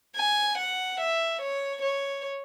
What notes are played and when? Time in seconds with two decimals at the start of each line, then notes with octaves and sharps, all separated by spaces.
0.16 G#5
0.58 F#5
1.00 E5
1.41 C#5
1.82 C#5